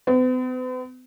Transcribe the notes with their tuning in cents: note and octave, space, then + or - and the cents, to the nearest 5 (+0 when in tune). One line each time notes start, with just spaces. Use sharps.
B3 +45